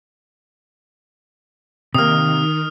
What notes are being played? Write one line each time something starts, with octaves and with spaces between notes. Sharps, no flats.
C3 D#3 A#3 D#6 F6